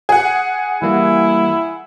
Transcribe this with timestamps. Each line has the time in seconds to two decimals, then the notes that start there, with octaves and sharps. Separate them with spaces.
0.09 G#4 F#5
0.82 E3 G3 A#3 E4